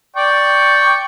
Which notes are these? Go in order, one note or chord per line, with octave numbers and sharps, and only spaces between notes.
D5 G5 C#6